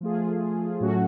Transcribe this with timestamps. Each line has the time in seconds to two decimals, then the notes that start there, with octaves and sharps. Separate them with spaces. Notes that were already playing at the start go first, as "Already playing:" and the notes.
0.01 F3 A3 F4 G#4
0.80 A2 F#3 A3 C#4 F#4